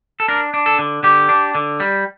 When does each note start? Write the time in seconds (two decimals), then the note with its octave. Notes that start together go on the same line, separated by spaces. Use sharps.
0.20 A4
0.28 D4 A#4
0.54 D4
0.66 A4
0.79 D3
1.03 D3 G4
1.29 D4
1.55 D3
1.80 G3